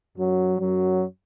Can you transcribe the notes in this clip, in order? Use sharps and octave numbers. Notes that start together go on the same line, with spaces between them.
F#2 F#3
F#2 F#3